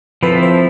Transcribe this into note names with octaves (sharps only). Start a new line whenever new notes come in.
F3 C4 E4 A4 B4
C5